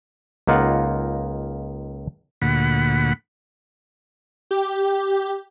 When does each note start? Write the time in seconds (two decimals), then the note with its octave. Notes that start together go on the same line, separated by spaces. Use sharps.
0.47 C#2 A#3 D#4 F4 F#5
2.42 D2 A#2 F#5 B5
4.51 G4